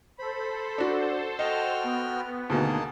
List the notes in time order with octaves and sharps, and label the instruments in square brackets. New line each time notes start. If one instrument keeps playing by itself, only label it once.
[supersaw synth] A4 C5 [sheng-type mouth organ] B5
[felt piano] D4 F#4
[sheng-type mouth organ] F#4 G5 F6 [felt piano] D#5
[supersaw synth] B3
[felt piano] D2 B2 D#3 [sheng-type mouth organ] A#3 G#4 A5